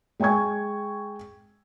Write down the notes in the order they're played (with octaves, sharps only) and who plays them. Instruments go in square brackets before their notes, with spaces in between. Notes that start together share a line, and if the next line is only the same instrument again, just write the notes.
[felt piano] G#3 G5 G#5 C#6 G#6